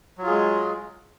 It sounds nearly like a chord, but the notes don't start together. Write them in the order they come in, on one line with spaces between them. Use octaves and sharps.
F#3 F4 G#4 G#3